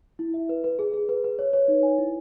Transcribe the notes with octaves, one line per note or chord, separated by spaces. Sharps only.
E4
E5
B4
B4
G#4
G#4
B4
B4
C#5
C#5
D#4
G#5
E4